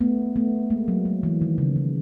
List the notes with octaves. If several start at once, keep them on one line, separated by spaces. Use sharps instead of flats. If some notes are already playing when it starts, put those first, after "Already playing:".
A3 B3
A3 B3
G#3 A#3
F#3
F#3
E3
D#3
C#3
C#3